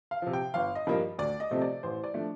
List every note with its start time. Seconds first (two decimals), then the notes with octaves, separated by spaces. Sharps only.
0.11 F5
0.22 C3 F3
0.33 G5
0.54 G1 F5
0.75 D#5
0.87 G2 F3 A#3
1.19 D2 D5
1.40 D#5
1.51 C3 F3 A3 C4
1.61 D5
1.83 A1 C5
2.04 D5
2.14 F3 A3 D4